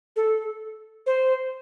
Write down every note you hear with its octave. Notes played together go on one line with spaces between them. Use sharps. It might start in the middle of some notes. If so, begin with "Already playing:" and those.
A4
C5